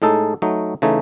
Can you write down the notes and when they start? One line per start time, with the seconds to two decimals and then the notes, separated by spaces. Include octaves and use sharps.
0.02 A2 G#3 D#4 A4
0.42 F#3 A3 D#4
0.82 C#3 E3 A3 D#4